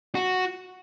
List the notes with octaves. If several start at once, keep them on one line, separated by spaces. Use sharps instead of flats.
F#4